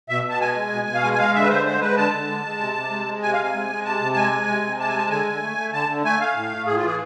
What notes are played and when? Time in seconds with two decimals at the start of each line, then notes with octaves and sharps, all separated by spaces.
0.09 B2 E5
0.25 B2 A5
0.40 G#3 G#5
0.56 G#3
0.72 B2
0.87 B2
0.95 F5
1.03 G#3 G#5
1.13 G#5
1.18 G#3 F5
1.34 D3 E5
1.42 B4
1.50 D3 C5
1.66 G#3 C5
1.81 G#3 B4
1.96 D3 A5
2.12 D3
2.28 G#3
2.44 G#3
2.60 C3
2.75 C3
2.90 G#3
3.07 G#3
3.22 C3 G#5
3.33 F5
3.39 C3 G#5
3.54 G#3
3.69 G#3
3.84 C3 A5
4.01 C3
4.13 A5
4.16 G#3 G#5
4.32 G#3
4.47 C3
4.64 C3
4.79 G#3 A5
4.88 G#5
4.94 G#3 A5
5.10 D3 G#5
5.26 D3
5.41 A3
5.57 A3
5.73 D3 A5
5.89 D3
6.04 A3 G#5
6.20 A3 F5
6.35 A2
6.51 A3
6.66 A2 G#4
6.77 F4
6.82 E3 G#4